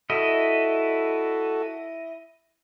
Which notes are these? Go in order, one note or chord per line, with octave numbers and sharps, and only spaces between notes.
E4 F#4 A4 D#5